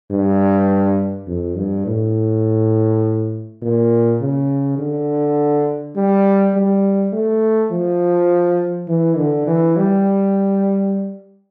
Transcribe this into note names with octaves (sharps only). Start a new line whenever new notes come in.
G2
F2
G2
A2
A#2
C#3
D3
G3
G3
A3
F3
E3
D3
E3
G3